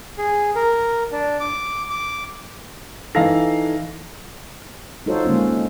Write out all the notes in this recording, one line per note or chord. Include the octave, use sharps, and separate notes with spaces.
G#4
A#4
D4
D6
D6
E3 D#4 A4 F5 A#6
D#4 F4 F#4 A4 C5 C#5
D3 G#3 A#3 C#4 F4